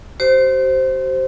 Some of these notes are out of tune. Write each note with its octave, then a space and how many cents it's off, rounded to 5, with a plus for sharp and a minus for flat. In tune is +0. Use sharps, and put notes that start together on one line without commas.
G4 -45 C5 +0